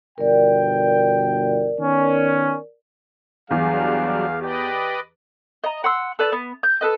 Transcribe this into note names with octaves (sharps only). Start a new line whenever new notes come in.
G1 B2 A#4 D5 G5
D#3 B3 C#4
E2 F#3 G3 D4 G#4 F5
G4 B4 D5 D#5
D#5 A#5
F#5 C6 E6
A4 B4 D5
B3
G6
A4 B4 D#5